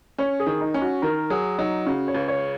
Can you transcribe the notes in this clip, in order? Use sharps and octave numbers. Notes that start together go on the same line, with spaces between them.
C#4 C#5
G#4
D#3
D#4
C#4
F#4
D#3 A#4
F#3 G#4
F#3 D#4
C#3 F#4
C#5
C#2
C#5